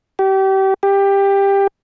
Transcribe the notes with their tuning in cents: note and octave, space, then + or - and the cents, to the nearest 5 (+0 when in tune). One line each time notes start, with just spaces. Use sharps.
G4 -30
G4 +15